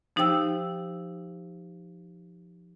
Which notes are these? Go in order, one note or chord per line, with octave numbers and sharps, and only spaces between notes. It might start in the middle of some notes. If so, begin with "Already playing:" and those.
F3 D#4 G4 C5 G5 E6